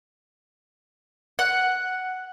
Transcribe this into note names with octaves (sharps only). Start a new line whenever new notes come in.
F#5